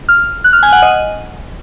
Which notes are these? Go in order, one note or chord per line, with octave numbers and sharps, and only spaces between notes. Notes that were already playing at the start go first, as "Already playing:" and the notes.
F6
F#6
F6
G#5
F#5
D#5